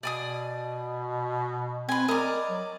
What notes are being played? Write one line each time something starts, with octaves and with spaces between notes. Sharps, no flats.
B2 D5 G#5 D#6
C4 B4 G#5
A#4 D5 D#5
F#3